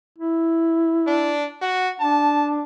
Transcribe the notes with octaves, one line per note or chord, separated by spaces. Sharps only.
E4
D4
F#4
D4 A5